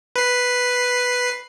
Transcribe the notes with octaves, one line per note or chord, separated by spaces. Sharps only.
B4 C7